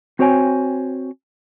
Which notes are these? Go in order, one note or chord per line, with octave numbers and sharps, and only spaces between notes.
C4 F#4 C5 C#5 G5 G#5